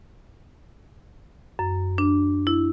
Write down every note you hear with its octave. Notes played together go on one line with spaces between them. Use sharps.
F#2
D4
E4